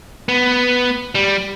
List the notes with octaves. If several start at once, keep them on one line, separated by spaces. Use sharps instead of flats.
B3
G3